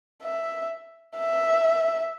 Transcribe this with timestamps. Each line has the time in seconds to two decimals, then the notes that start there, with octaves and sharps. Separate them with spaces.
0.23 E5
1.17 E5